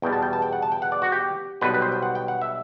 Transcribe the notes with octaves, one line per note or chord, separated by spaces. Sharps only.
E2 B2 G3 G5
A5
G5
A5
G5
F#5
A5
G5
F#5
D5
F#4
G4
B1 B2 G3 B4
B4
C5
G5
F#5
G5
F#5
E5